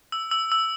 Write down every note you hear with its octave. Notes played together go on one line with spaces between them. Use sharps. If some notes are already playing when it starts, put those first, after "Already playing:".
E6
E6
E6